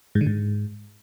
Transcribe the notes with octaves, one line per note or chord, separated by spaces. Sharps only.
G#2
D3
G#2